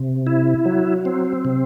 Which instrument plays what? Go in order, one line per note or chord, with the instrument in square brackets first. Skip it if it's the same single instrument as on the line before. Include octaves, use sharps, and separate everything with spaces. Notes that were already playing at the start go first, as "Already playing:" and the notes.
Already playing: [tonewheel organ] C3
E4
F#3
C4
C3